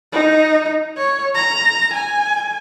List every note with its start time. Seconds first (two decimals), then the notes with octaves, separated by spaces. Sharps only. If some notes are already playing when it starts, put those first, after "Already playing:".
0.12 D#4
0.97 C#5
1.35 A#5
1.93 G#5